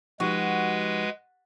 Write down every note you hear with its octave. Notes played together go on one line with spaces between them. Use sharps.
F3 G#3 D#4 F#4 G4 B4